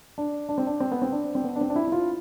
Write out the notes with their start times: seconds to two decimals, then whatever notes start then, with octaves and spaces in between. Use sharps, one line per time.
0.18 D4
0.49 D4
0.58 C4
0.67 D4
0.80 C4
0.91 B3
1.02 C4
1.12 D4
1.35 C4
1.44 B3
1.56 D4
1.61 C4
1.70 D4
1.76 E4
1.88 E4
1.92 F4